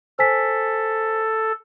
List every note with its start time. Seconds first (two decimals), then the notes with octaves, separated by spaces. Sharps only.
0.19 A4 C5 G#5 B6